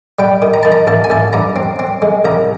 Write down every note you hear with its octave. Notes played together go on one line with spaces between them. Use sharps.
G3 G5
D#3
A#5
D#3 A5
A#5
A1 A5
G#5
A1 A5
G2 A#5
C4
C4
G#3
C2 A#5